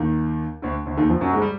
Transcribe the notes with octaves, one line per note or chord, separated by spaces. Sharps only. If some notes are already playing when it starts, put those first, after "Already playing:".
Already playing: D#2 D#3
D2 D3
D2 D3
D#2 D#3
F2 F3
F#2 F#3
G#2 G#3
G3